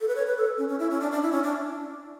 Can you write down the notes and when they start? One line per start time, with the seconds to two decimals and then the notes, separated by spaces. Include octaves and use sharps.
0.01 A4
0.08 B4
0.15 C#5
0.27 B4
0.37 A4
0.58 C#4
0.68 C#4
0.79 E4
0.90 C#4
1.00 D4
1.11 D4
1.22 E4
1.32 C#4
1.43 D4